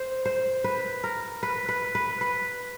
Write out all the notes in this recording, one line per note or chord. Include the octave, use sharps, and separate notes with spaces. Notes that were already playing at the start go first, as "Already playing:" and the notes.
Already playing: C5
C5
B4
A#4
B4
B4
B4
B4